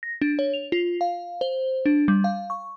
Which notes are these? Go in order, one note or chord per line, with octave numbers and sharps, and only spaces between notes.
A#6
D4
C#5
F7
F4
F5
C5
D4
G3
F5
C#6